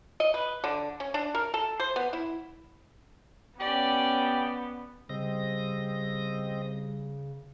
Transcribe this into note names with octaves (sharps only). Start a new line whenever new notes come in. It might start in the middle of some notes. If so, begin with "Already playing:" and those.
D#5
B4
D3
C#4
D4
A#4
A4
C5
B3
E4
B3 C#4 G4 D5
C#3 G3 C4 D#5 A#6